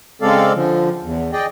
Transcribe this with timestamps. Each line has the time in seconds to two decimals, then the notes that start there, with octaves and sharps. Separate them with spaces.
0.22 C#3 G#3 C4 A4 D5 F5
0.54 D3 F3
1.03 E2
1.33 G#4 D5 D#5 G5